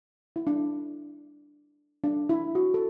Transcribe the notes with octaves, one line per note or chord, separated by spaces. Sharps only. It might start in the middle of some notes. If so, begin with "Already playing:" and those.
E4
D4
D4
E4
F#4
A4